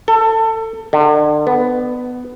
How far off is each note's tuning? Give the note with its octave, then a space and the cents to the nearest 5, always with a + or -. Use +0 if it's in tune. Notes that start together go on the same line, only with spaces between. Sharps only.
A4 +25
D3 +35
B3 +10